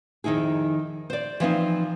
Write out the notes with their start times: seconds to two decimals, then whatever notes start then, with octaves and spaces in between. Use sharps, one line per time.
0.24 F2 D#3 D#4 E4 G#4
1.10 C5 D5
1.40 E3 F3 C4 D#4